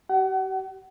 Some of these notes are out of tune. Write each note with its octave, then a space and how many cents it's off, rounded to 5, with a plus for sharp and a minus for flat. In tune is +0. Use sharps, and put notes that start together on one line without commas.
G4 -40 F#5 +35